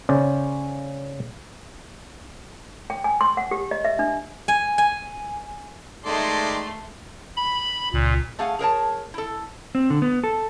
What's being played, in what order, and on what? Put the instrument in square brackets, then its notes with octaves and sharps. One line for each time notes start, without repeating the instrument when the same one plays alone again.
[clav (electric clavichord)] C#3 C#4 C5 D5
[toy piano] G5
G#5
C6
F#5
G4
D#5
E5
D4
[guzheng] G#5
G#5
[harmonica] D#3 G#3 D5 [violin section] A3 C6
[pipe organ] B5
[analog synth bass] C#2 [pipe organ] A#2
[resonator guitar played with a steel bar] A3 G#4 F5 F#5
G#4 A#4 C#5 A5
E4 A4
[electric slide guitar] C4
D3
B3
A4